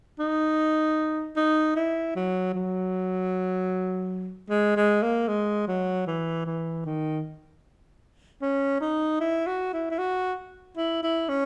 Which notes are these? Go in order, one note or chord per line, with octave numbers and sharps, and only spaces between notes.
D#4
D#4
E4
F#3
F#3
G#3
G#3
A#3
G#3
F#3
E3
E3
D#3
C#4
D#4
E4
F#4
E4
E4
F#4
E4
E4
C#4